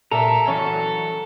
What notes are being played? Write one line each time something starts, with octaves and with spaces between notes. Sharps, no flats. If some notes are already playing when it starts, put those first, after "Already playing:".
A#2 A4 A#4 D5 E5 A#5
E3 F#3 C#4 A4